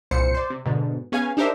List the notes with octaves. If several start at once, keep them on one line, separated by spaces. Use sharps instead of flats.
G1 C2 A#2 C5 C#7
C5 D5
C3
G#2 B2 D3
B3 C#4 G#4 F5 G#5
D4 D#4 G4 A#4 C5 E5